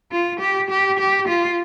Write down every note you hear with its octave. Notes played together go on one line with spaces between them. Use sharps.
F4
G4
G4
G4
F4